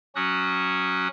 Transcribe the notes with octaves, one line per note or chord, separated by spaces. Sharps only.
F#3 C#4 F#4 D#6 F#6